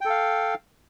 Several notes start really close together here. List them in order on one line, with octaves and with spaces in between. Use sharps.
G5 A4 F5